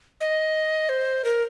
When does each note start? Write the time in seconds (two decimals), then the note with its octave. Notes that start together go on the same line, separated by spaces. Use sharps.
0.21 D#5
0.89 C5
1.25 A#4